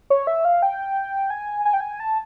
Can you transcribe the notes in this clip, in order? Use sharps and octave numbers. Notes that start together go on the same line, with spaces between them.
C#5
E5
F5
G5
G#5
G#5
G5
G#5
A5